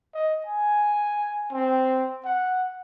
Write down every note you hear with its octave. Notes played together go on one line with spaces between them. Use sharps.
D#5
G#5
C4
F#5